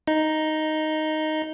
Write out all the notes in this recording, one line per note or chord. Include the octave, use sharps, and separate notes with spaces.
D#4